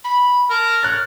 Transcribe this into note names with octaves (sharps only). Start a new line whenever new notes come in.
B5
A#4 A5
C#5 F6 F#6 A6